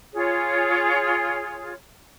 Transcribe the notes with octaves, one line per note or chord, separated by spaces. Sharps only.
F4 G#4 C#5